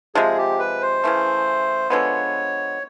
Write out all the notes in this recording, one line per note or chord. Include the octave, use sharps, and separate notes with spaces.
C3 F3 G#3 G#4
G4
B4
C5
C#3 E3 A3
D3 F3 G#3 B3 C#5